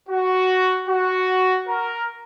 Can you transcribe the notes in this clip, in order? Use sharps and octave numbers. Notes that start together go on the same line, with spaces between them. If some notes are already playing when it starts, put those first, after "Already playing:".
F#4
F#4
A#4